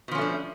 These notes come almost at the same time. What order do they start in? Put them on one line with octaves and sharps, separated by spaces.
B2 F3 C#4 A3 D4